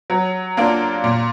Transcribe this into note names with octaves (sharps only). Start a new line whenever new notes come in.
F#3
A#3 D4 F4
A#2